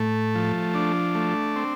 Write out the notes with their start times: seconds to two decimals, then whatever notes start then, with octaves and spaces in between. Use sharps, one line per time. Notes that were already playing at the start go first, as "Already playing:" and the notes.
Already playing: A2 A3
0.35 F3
0.75 D4
1.15 A3
1.56 C4